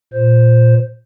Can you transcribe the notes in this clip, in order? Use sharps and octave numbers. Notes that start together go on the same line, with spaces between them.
A#2 C5